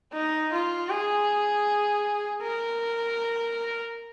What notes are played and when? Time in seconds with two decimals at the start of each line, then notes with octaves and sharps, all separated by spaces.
0.13 D#4
0.52 F4
0.90 G#4
2.42 A#4